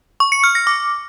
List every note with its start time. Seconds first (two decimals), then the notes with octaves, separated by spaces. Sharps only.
0.20 C#6
0.32 C#7
0.44 F6
0.55 A#6
0.67 D6